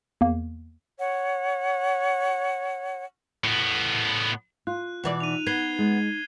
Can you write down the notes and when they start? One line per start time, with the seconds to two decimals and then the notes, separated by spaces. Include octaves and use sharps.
0.21 E2 A#3
0.98 C#5 F#5
3.44 A2 B3
4.67 F4 F#6
5.04 B2 E3 D5
5.20 D#4 D#7 F7
5.47 B3 G#6 C7 G7
5.79 G#3